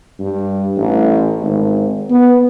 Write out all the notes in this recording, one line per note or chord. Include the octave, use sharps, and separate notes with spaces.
G2
A1
G#1
B3